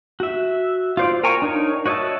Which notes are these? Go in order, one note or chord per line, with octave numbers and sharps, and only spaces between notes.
F#4 E5
F4 C5 D5
A#4 G5 G#5 A#5 C#6
D4 D#4 A#4 C#5
F#4 C#5 D#5 E5 A5